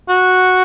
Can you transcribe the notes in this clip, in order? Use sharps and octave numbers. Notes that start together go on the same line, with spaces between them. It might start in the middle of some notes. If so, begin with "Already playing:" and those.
F#4